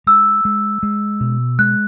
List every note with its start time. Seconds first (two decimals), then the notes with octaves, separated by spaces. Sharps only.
0.07 G#3 E6
0.45 G#3
0.83 G#3
1.21 B2
1.59 G#3 F#6